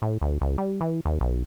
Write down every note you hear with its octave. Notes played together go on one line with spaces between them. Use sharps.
A2
D2
C#2
G3
E3
D#2
B1